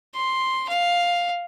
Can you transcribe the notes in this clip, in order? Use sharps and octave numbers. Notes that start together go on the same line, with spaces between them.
C6
F5